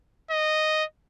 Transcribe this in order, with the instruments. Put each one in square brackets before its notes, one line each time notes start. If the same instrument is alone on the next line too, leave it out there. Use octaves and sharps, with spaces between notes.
[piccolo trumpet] D#5